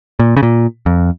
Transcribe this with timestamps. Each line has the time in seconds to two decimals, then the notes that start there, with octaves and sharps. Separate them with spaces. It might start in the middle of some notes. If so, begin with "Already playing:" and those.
0.19 A#2
0.37 C#3
0.43 A#2
0.86 F2